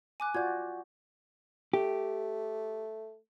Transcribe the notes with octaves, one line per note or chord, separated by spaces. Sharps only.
G#5 D6 F#6
F4 F#4 D5 G6 G#6
A3 G4